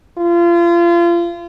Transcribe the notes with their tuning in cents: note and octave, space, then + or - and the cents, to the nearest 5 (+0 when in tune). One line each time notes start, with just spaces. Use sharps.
F4 -30